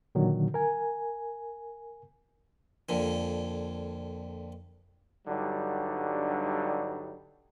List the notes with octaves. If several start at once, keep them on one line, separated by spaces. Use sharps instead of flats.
A#2 D3 D#3 F#3
A#4 G#5
F2 A#2 D3
G2 D3 F#3 G3 D#4